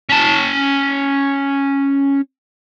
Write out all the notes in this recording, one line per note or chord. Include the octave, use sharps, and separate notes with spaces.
C#4 A5